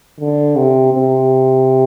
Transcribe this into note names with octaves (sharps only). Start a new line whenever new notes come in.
D3
C3
C3